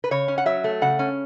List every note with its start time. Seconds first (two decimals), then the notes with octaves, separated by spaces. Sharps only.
0.04 B4
0.11 C#3 C#5
0.28 C#4
0.38 F#5
0.46 F#3 E5
0.64 A3
0.82 C#3 F#5
0.99 C#4